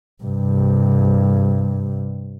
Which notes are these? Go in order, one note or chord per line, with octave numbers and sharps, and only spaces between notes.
G2 C3